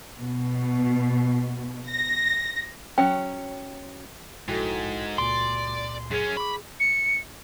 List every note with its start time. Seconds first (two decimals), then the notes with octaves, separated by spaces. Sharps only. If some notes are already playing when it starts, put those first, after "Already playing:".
0.21 B2
1.89 A#6
2.98 F#3 C#4 G5
4.48 A#1 G#2 E4 F#4 A4 G5
5.18 C#2 A#2 D5 G#5 C6
6.11 F#2 C#4 G#4
6.37 B5 C#6 D6
6.80 C#7